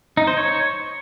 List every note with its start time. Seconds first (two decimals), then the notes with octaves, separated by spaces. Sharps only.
0.17 D#4
0.27 C5
0.37 C#5